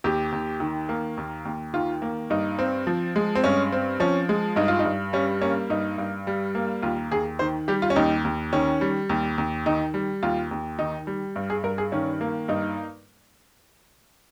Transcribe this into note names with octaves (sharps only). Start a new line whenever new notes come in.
D#2 G4
D#2
D#3
A#3
D#2
D#2
D#3 F4
A#3
G2 D#4
C4
F3
G#3
C4
G2 C#4
C4
F3 C#4
G#3
G2 D#4
F4
D#4
G2
G3 C#4
A#3 C#4
G2 D#4
G2
G3
A#3
D#2 F4
D#2 G#4
D#3 C5
G3 G4
F4
C#4
D#2 D#4
D#2
D#3 C#4
G3
D#2
D#2
D#3 D#4
G3
D#2 F4
D#2
D#3 D#4
G3
G2
G#4
G2 A#4
G#4
D#3 C#4
A#3
G2 D#4